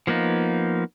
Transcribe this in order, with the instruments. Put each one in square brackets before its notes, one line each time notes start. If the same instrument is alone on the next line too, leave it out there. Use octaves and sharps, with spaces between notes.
[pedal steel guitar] F3 A#3 B3 D#4